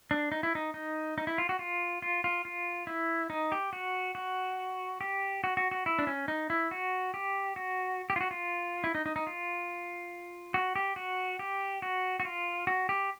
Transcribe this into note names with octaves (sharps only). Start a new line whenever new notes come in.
D4
D#4
E4
D#4
D#4
D#4
E4
F4
F#4
F4
F4
F4
F4
E4
D#4
G4
F#4
F#4
G4
F#4
F#4
F#4
E4
D4
C#4
D#4
E4
F#4
G4
F#4
G4
F4
F#4
F4
E4
D#4
D#4
D#4
F4
F#4
G4
F#4
G4
F#4
F#4
F4
F#4
G4